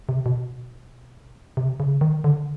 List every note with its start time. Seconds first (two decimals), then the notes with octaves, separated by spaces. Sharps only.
0.09 C3
0.26 B2
1.57 C3
1.80 C#3
2.01 D#3
2.24 D3